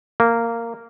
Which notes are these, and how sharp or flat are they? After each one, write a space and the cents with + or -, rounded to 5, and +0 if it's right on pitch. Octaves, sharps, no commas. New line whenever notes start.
A#3 -10